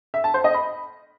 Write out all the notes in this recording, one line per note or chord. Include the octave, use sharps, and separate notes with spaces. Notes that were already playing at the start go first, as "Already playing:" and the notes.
E5
A5
C5
D#5
B5